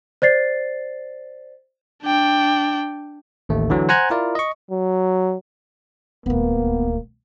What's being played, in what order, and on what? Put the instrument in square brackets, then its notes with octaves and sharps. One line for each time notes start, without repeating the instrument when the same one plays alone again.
[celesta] C5 D5 A6 C7
[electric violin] D4 G5
[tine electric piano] A1 D#2 A3
D3 E3 F#3
C5 F#5 G#5 A#5 F#6 G#6
E4 F4 A#4 D5
D#5 C#6
[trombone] F#3
[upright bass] D#1 D2 [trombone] A#3 [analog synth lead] B3